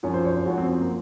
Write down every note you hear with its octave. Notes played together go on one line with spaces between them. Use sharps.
F#2 F3 C#5
C5
C#5
C#5
F#2 F3 F#4
C4
C4
A#3